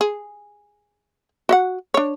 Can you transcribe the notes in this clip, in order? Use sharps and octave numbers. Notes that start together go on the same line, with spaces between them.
G#4
F#4 E5 F#5
D4 C#5